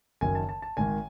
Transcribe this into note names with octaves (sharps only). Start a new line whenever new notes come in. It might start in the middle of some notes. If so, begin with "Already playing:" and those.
F#1 F#2 D#3 G#5
A5
A5
A5
G#1 G#2 D#3 G#5